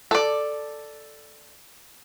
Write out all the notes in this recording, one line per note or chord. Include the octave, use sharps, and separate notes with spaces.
A4 D5